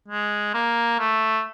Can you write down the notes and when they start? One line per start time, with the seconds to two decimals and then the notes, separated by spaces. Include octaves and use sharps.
0.08 G#3
0.54 A#3
0.99 A3